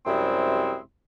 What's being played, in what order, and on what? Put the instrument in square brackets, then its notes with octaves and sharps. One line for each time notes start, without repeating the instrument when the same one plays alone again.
[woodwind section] F#2 C3 G3 G#3 C4 E4